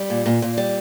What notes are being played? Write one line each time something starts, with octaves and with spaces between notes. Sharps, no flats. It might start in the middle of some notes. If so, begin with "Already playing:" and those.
Already playing: G3
A#2
A#2
A#2
G3